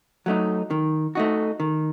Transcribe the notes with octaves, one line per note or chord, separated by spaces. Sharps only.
F#3 A3 D#4
D#3
A3 D#4 F#4
D#3